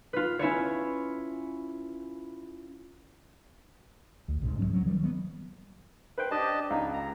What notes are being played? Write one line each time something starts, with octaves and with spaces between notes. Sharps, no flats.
F4 B4
C#4 E4 F4 C#5
D2
C2 G#2
D#1 E2 F#3 C#4
F#3
D#3 G3
F#3 B3
B4 C5 G5
D4 G4 D#5 A5
C#2 D#4
A#5